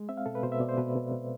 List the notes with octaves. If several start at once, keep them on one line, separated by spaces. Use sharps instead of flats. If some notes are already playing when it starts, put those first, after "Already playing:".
Already playing: G#3
C4 E5
F5
B2 A4
B4
B2 C5
E5
B2 D5
C5
B2 B4
B2
B2